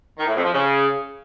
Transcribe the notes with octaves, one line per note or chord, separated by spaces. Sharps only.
D#3
A2
F2
F3
C#3